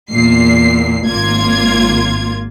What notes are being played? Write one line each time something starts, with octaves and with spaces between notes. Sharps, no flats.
E2 A#2 C7
G#1 A#3 F4 G#6